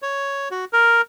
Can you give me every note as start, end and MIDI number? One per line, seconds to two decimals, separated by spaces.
0.02 0.49 73
0.51 0.65 66
0.73 1.01 70